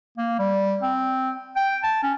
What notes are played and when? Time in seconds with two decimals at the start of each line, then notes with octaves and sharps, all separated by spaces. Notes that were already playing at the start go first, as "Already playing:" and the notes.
0.18 A#3
0.39 G3
0.83 C4
1.56 G5
1.83 A5
2.03 C#4